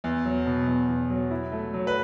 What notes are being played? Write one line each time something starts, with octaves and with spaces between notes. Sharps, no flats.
E2
F#3
B2
E2
E2
F#3
E4
A3
F#3
B4